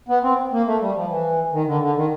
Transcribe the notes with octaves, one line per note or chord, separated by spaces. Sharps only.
B3
C4
A#3
A3
G3
F3
E3
D#3
D3
D3
D#3